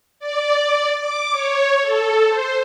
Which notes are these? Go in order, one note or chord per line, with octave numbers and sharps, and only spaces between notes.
D5
D6
C#5
A4
C5